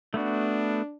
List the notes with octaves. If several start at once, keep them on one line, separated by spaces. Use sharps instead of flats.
A3 B3 D4 F#4